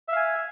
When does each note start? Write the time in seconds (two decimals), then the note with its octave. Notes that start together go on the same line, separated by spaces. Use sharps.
0.08 E5
0.12 F5
0.16 G#5